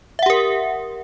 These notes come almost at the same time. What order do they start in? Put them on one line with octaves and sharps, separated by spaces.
E5 F#5 G4 A#4